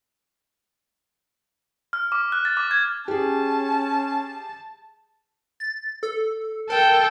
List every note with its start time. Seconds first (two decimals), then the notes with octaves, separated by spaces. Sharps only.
1.93 F6
2.12 D6
2.32 F#6
2.45 A6
2.57 D6
2.71 G#6
3.08 C#4 G4 G#4 A5
5.60 A6
6.03 A4
6.70 A4 A#4 G5